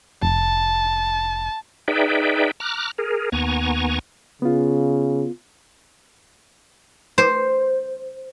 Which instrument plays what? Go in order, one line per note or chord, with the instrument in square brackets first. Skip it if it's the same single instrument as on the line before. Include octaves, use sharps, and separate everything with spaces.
[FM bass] F1 [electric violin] A5
[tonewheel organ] D#4 G#4 B4 D5 E5 G5
A#5 D6 F6 F#6
G#4 A#4
D#2 B3 G#5 A#5 C#6
[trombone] C#3 [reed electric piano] B3 F4
[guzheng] C5